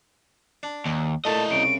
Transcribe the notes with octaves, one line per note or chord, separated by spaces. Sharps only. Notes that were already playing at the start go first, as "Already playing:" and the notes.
D4
D#2
A#2 A3 E4 D#5 A5
C2 C#3 D7